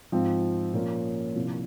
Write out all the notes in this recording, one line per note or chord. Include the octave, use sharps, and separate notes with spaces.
G#2 F3 C4 F4
A#2 F3 A#3 C#4 F4
C2 A#2 F3